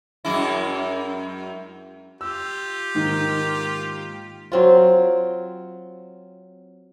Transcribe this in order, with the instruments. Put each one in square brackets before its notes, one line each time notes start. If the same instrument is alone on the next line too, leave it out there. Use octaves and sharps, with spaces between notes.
[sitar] F#2 G#3 E4
[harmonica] F4 G4 [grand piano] E6
[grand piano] G#2 D#3 A#3
[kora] F#3 C4 F4